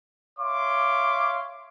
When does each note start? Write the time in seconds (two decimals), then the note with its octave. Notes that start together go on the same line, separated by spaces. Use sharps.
0.39 C#5 E5 F5 C6 D6